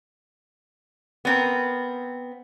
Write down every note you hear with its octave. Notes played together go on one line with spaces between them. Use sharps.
B3 C4 A#4